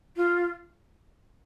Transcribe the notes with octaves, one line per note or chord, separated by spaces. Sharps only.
F4